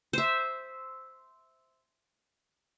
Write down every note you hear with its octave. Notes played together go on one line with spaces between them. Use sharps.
C5 E5